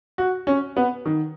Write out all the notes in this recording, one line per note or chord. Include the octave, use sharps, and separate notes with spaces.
F#4
C#4
B3
D#3